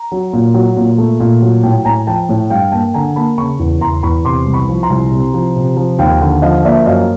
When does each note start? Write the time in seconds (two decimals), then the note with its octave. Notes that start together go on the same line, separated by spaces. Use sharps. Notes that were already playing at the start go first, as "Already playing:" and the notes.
Already playing: A#5
0.12 F#3
0.33 A#2
0.54 F#3
0.76 A#2
0.98 A3
1.20 A#2
1.42 F#3
1.63 A2 G5 A5
1.85 A2 G#5 A#5
2.07 F3 G5 A5
2.29 A2
2.50 G2 F5 G5
2.72 A#3 G5 A5
2.94 D3 G#5 A#5
3.16 A#3 A5 B5
3.38 C#3 B5 C#6
3.59 E2
3.81 E2 A#5 C6
4.03 E2 B5 C#6
4.25 C3 C6 D6
4.46 C2
4.53 B5 C#6
4.69 F3
4.83 A#5 C6
4.90 C2
5.11 C3
5.34 F3
5.56 C3
5.77 F3
5.99 D#2 F5 G5
6.21 D3
6.42 F3 D#5 F5
6.64 A#3 D5 E5
6.86 F#2 D#5 F5